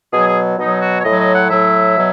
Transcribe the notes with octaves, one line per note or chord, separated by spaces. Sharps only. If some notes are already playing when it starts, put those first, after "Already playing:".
B2 F#3 G#4
G#4
B2 F#3 D#4
F#4
C#5
A2 F#3 D#5
D#5
F#5
A2 F#3 E5
B2 F#3